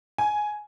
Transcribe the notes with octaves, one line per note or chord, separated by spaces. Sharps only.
G#5